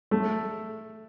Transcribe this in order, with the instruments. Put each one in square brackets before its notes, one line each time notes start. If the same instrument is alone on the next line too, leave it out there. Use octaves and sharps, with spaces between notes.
[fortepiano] A3